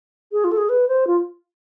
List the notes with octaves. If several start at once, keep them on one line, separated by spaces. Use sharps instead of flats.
G#4
F4
A4
G#4
B4
C5
F4